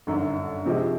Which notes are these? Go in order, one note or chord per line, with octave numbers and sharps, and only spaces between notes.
G1 F#2 D3
C3 F3 G#3